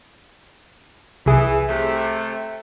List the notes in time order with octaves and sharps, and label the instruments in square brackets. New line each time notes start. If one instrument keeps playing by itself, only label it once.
[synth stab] C2 G#4 [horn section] E3
[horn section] C3 A3